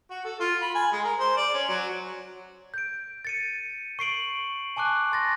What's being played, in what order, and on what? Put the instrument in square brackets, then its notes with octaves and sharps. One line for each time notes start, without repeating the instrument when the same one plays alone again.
[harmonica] F#4
A4
F4
B5
G#5
G#3
A#4
C5
D5
C#4
F#3
[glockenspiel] G6 D7
A6 C#7 D#7
C#6 C7 D7 F#7
G#5 A5 C#6 D6 F#6
C6 A6 A#6